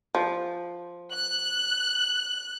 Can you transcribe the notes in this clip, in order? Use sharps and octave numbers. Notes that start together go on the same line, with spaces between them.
F3
F#6